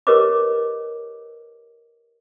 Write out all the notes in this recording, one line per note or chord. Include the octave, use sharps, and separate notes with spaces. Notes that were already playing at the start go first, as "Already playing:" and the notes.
G4 A#4 B4 C#5 D#5 D6